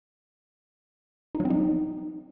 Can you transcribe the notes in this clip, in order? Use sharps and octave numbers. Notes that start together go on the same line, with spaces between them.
D#4
F#3
C4
D#4